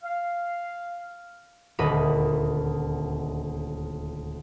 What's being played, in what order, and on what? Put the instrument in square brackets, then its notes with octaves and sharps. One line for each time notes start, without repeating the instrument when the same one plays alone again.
[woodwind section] F5
[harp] D#1 D2 D#5 B5 D#7